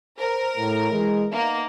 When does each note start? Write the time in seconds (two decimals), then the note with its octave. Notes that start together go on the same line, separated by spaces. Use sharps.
0.19 A#4 C5
0.57 A2
0.90 E3 G#3
1.31 A#3 B3 D#4 E5